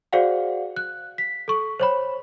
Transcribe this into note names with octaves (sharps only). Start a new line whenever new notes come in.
F#4 G#4 C5 D5 F5 F#5
F#6
B6
A4 C#6
C5 C#5 B5